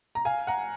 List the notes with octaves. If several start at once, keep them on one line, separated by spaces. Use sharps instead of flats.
A#5
F5 G#5
F#5 A#5